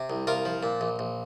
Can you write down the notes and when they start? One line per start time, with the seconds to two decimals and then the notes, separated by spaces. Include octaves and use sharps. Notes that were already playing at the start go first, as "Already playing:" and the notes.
Already playing: C3
0.10 C2
0.27 C2 F4 A#4
0.45 F3
0.63 A#2
0.81 A#1
0.99 A#1